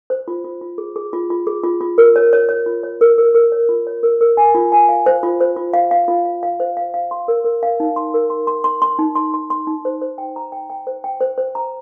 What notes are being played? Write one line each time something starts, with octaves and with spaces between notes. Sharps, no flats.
C5
F4
F4
F4
G#4
G#4
F4
F4
G#4
F4
F4
A#4
C#5
C#5
C#5
F4
C#5
A#4
A#4
A#4
C#5
F4
C#5
A#4
A#4
G#5
F4
G#5
F5
C5
F4
C5
F4
F5
F5
F4
F5
F5
C5
F5
F5
C6
A#4
A#4
F5
D#4
C6
A#4
C6
C6
C6
C6
D#4
C6
C6
C6
D#4
C5
C5
G5
A#5
G5
G5
C5
G5
C5
C5
A#5